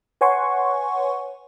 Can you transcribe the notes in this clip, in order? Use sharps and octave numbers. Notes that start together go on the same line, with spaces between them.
B4 C#5 F#5 G#5 C6 C#6